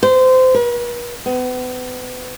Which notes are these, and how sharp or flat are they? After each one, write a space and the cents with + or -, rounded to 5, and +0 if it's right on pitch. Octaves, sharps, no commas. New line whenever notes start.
C5 -25
B4 -45
B3 +35